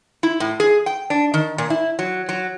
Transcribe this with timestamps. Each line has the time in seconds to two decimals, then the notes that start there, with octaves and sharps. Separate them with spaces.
0.23 E4
0.40 A2
0.60 G#4
0.86 G5
1.10 D4
1.34 D#3
1.58 A#2
1.70 E4
1.99 F#3
2.29 F#3